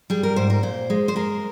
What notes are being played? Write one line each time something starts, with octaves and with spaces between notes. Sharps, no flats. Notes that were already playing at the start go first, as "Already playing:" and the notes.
G3 G#4
A#4
G#2 C5
A#4
A#2 C5
G#3
C5
G#3 A#4